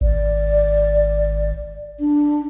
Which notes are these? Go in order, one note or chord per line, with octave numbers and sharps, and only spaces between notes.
G#1 D5
D4